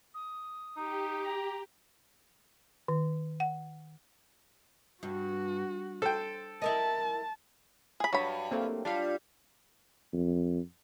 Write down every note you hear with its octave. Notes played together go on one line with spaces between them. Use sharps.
D#6
D#4 G4
A#5
D#3
F#5
G2 F#4
A4 C5 G5
E4 A#4 D#5 A5
G#4 B5
G2 F#3 B5
A3 A#3 C4
G3 D4 F4 F5
F2